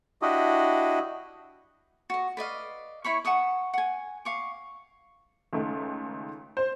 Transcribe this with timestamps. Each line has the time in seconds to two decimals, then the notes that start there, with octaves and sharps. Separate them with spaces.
0.22 D4 E4 F#4 G4 D#5
2.10 F#4 D#5
2.37 B4 D5 D#5 F5
3.04 E4 C#5 B5 C#6
3.25 F#5 A5 C#6 D#6
3.74 F#5 G#5
4.25 F5 C#6 D6
5.53 C#2 D#3 A3
6.57 C5